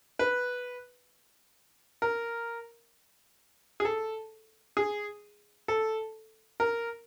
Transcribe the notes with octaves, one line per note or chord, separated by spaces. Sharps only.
B4
A#4
G#4
A4
G#4
A4
A#4